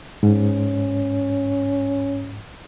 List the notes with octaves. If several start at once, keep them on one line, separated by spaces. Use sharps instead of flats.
G#2 C#4